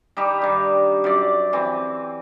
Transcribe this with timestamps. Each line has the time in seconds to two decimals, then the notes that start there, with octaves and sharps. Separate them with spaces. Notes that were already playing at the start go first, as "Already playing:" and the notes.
0.17 G3 D#4 G4
0.42 G2 D#3
1.04 F#2 D5
1.53 E3 C4